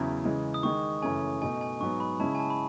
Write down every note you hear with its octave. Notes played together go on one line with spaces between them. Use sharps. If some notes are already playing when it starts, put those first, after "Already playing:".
Already playing: E2 C#3 F#3 C#4 E4
C#3 E3 G#3
D#6
D#3 G#3 D#4 C#6
F#2 C#3 E3 A3 C#4 G#5
B2 A3 D#4 G#5
G#5
G#2 F#3 B3 C#6
B5
C#3 G#3 C#4 E4 A5
G#5
A5
B5